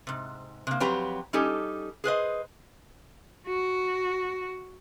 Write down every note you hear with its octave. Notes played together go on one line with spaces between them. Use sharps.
G#2 C3
C3 A#3
F2 F#3 C4 G4 B4 A#5
G3 C#4 D#4 G4 A4
G#4 B4 C5 D#5
F#4